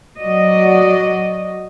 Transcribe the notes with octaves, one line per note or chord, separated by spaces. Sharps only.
F#3 F#4 D5 D#5